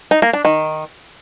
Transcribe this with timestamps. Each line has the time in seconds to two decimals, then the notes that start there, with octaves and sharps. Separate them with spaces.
0.11 D#4
0.22 A#3
0.33 D4
0.45 D#3